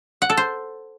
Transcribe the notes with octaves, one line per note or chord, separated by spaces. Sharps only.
F#5
A4
C5